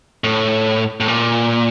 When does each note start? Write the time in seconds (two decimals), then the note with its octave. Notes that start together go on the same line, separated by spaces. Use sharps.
0.24 A2
1.00 A2
1.08 A#2